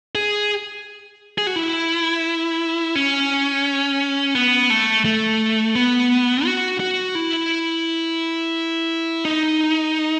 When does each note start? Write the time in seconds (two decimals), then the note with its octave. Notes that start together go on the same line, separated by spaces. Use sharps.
0.15 G#4
1.38 G#4
1.47 F#4
1.56 E4
2.95 C#4
4.35 B3
4.70 A3
5.05 A3
5.75 B3
6.45 F#4
6.80 F#4
7.15 E4
9.25 D#4